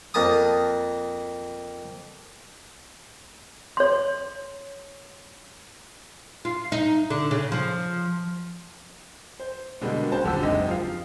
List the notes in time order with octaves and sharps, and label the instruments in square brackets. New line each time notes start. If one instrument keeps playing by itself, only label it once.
[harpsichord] F2 A#3 A5 D#6
[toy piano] C#5 C6
[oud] F4
D#4
D3
C#3
F3
[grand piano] C5
B2 D3 G3 G#3 A#3
C#4 F#4 C5 A5
D#1 D3 G4 E6
F#1 G#3 C4 D#4 G4
F3 F5